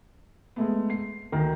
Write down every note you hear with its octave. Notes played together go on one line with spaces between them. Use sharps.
G#3 A3 B3
C7
D2 D#3 A#4